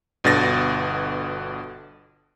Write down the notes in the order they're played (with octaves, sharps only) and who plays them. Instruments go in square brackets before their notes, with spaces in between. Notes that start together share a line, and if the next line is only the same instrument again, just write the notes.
[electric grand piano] G1 B2 D3 A6 A#6